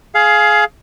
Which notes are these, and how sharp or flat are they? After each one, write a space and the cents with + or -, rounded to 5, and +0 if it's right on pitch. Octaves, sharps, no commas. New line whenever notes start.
G#4 +20 F5 +0